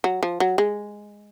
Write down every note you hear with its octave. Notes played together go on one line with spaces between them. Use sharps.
F#3
F3
F#3
G#3